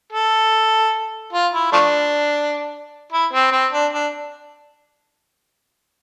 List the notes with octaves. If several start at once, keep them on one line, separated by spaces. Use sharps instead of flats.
A4
F4
E4
F3 A3 D4
E4
C4
C4
D4
D4